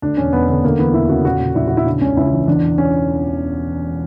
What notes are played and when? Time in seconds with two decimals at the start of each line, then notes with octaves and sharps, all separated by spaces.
0.02 D2 D4
0.17 E1 C#4
0.33 E1 B3
0.49 D3 B3
0.64 D2 A#3
0.79 E3 B3
0.94 E1 E4
1.09 C#3 F#4
1.25 A#2 F#4
1.41 A#2
1.55 A#1 E4
1.67 A#1 F#4
1.77 E4
1.86 C#3 D4
2.01 C#2 C#4
2.17 C#2 E4
2.32 E3
2.48 E2 D4
2.62 E1
2.78 C#4